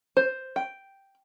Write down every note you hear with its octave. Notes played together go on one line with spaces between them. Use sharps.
C5
G5